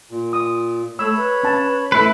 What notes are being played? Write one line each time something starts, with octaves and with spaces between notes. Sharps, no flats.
A#2
D#6
A3 C#5 B5 E6
B4
C#4 A5
A3 E4 B4